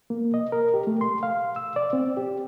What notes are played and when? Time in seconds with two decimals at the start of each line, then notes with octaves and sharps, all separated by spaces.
0.10 A#3
0.34 D#5
0.52 A#4
0.74 G4
0.87 A3
1.01 C6
1.23 F5
1.56 E6
1.76 D5
1.93 C4
2.17 G4